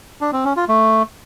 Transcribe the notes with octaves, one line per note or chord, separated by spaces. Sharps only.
D4
C4
C#4
F4
A3